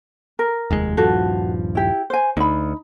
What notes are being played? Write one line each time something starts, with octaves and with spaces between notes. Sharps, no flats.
A#4
F1 D#2 G#3
D#1 G2 F3 F#4 A4
E4 G4
C5 G#5
D2 D#4 B5